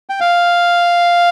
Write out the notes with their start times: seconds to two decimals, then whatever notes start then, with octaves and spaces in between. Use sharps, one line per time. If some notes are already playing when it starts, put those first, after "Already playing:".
0.09 G5
0.20 F5